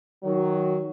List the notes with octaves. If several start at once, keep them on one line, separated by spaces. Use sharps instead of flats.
D#3 F#3